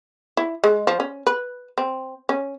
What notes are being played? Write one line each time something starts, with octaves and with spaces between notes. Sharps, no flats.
E4
G#3
F3
C#4
B4
C4
C#4